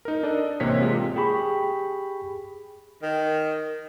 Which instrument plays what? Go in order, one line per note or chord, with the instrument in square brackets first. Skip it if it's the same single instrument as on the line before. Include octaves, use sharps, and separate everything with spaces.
[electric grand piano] D#4 A#4
D4 A4 D5 D#5
A1 C3 A#3 C#5 B6
G#3 F4 G4
[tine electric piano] G4 G#4 G5 B5 C#6
[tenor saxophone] D#3